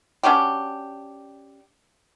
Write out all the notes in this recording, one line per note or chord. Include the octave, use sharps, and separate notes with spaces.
C#4 D4 F#4 G4